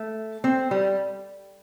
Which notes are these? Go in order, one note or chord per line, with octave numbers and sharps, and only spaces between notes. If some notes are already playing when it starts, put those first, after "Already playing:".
Already playing: A3
C4
G3